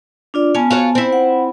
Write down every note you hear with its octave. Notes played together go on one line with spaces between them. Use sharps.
D4 F4 D5
B3 C#4 G#5 A5
F4 F#4 C#5
C4 E4
F#5